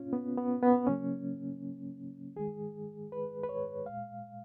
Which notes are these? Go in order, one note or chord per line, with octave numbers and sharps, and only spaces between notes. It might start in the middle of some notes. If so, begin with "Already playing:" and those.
Already playing: B2 A#3 C#4 F4
B3
B3
B3
C#3 F#3 A#3 C#4
D#3 G#3 G#4
B4
B4
C#5
A#2 G#3 F5